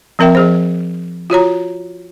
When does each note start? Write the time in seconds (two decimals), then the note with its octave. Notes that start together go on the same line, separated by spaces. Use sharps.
0.19 F3 C4 A#4 E5 G5
0.35 F3 G#4 C5
1.30 F4 F#4 C#5 A#5